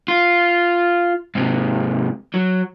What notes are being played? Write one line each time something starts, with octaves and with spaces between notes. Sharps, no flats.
F4
G#2 C3
F#3